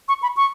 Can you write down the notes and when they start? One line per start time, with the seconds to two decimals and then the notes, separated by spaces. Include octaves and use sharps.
0.08 C#6
0.22 B5
0.37 C#6